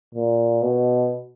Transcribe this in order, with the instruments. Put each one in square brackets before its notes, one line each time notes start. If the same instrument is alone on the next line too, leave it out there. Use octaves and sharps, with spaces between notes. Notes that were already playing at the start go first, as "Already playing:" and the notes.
[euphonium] A#2
B2